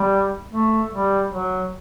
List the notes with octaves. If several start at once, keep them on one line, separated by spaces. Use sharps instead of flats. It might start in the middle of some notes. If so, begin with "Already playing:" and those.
Already playing: G3
A3
G3
F#3